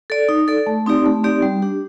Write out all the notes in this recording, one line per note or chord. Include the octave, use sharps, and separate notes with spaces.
A4 D5
D#4
A4 D5
A3
C4 D#4 G4 D5
A3
C4 D#4 G4 D5
G3
D4 G4